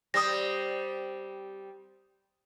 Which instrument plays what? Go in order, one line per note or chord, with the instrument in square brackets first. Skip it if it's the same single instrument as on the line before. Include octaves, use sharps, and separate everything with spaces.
[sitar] G3 C4 [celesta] D#6 A#6